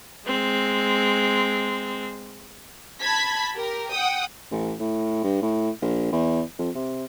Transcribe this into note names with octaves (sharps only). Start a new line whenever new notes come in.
G#3 C4
A5 B5 G#6 B6
G4 A#4
F#5 G5 D#6
A1
A2
G2
A2
A#1
E2
F2
C3